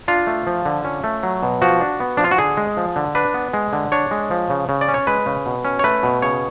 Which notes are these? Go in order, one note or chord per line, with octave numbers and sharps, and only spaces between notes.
D4 F4
A3
F3
D3
C#4
A3
F#3
B2
F3 F#4
D4
B3
F3 D4
F4
F#4
D3 G#4
G#3
F3
D3
D4 B4
B3
G#3
D3
D4 C#5
G#3
F3
C#3
C#3
D5
C#4
C#5
G#3 B4
C#3
B2
C#4
C#5
A3 B4
B2
C#3 C#5